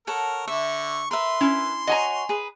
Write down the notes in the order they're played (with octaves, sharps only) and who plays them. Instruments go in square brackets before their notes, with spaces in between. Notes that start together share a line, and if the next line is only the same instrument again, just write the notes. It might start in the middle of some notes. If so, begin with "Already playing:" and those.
[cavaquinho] A4 C#5 F#5 [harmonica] A#4
[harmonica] D3 C#6 [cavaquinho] E5
[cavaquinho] A#4 B4 E5 [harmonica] C6
[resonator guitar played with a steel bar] C#4 E4
[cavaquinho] F#4 C#5 [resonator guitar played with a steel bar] D#5 G#5 A#5
[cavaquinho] G#4 B4